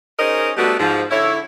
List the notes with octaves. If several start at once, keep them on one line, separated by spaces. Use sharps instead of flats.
C#4 D#4 G#4 A#4 C5 D#5
G3 A3 B3 D4 F#4
G#2 F3
D3 E4 C#5